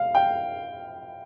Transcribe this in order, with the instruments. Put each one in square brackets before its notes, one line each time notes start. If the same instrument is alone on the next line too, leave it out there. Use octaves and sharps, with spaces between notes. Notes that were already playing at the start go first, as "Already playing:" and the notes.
Already playing: [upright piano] F5
G5